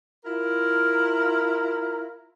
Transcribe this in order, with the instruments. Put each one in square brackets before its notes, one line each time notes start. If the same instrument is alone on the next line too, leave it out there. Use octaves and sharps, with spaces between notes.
[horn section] E4 F4 A#4